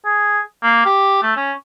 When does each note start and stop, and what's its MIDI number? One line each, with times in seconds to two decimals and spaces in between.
0.05 0.40 68
0.63 0.84 58
0.86 1.21 67
1.22 1.32 57
1.37 1.52 61